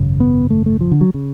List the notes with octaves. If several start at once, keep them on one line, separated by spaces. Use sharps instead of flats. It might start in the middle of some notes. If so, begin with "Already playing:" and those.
Already playing: G#1 F#2 C#3
B3
A3
A3
F3
D3
F#3
C#3